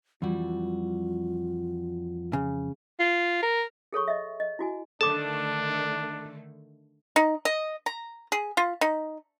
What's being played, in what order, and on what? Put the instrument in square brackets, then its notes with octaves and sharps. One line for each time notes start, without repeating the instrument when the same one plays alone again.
[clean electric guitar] F2 F#4 [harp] E3 G3 [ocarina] F4
[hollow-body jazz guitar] C#3
[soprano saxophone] F4
A#4
[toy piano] G#4 A4 C#5 C#6
D#5 E5
D#5
E4 F#4 G#5
[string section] D3 D#3 A3 [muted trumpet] D4 [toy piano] A4 D6 [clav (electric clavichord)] A5
[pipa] D#4
D#5
A#5
G#4
F4
D#4